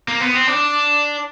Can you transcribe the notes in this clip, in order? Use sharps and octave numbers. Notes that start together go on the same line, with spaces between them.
A#3
B3
C4
D4